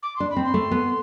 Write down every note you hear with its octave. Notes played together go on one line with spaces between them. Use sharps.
D6
D4 C6
B5
C4
C6
A3
B3